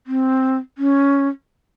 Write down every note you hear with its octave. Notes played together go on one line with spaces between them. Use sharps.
C4
C#4